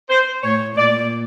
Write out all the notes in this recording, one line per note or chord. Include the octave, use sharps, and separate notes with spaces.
C5
A2 C#5
A#2 D5